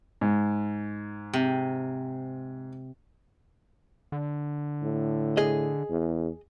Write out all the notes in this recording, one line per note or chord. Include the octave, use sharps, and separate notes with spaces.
G#2
C3
D3
A2
G#4 D#5
E2